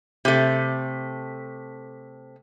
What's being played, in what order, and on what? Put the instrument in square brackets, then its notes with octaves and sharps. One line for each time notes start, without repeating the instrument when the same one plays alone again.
[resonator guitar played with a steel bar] C3 A3